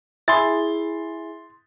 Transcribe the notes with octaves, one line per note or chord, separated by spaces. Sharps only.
E4 G#4 C6 A6